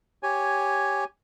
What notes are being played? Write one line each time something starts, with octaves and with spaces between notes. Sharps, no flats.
G4 C#5 G#5